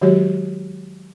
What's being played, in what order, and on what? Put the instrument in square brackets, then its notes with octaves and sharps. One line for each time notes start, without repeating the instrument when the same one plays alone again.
[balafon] D#3 F#3 G#3 F#4 G4 C#5